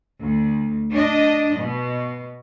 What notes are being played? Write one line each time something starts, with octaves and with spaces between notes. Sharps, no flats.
D2
D4 D#5
B2